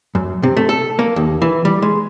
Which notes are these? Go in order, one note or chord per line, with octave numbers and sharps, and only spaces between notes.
F#2
C3
A3
A4
A#3
D#2
E3
G3
G#3